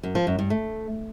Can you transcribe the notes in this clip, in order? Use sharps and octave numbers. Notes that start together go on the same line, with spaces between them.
F#2
F3
F#2
G2
A3